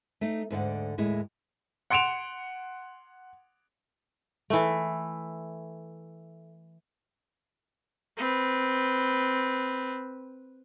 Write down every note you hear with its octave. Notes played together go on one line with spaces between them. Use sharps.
A3 D#4
D2 G#2 D3 D5 F#5
D#2 A2 G#3 E4
F#5 C6 C#7 D7 E7 F7
E3 A3
C4 B4